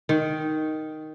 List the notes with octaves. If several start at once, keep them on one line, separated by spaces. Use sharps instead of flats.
D#3